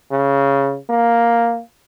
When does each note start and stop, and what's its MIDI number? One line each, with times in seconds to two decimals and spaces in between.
0.12 0.78 49
0.90 1.61 58